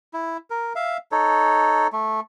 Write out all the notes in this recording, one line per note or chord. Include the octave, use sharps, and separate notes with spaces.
E4
A#4
E5 F5
D#4 A4 C#5
A3